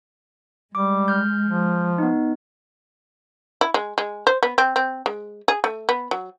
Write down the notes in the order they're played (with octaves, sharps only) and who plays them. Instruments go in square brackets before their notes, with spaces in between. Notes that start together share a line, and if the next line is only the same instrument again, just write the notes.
[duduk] G3 [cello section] G#3 [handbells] D6
[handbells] F6 G6
[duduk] F3
[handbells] B3 D#4
[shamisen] E4
G#3
G#3
C5
B3
C4
C4
G#3
G#4
A3
B3
F#3